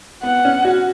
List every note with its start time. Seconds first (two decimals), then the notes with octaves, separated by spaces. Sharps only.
0.23 B3 F#5
0.45 C#4
0.65 F#4